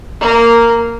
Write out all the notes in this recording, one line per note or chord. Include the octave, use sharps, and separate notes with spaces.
A#3 A#4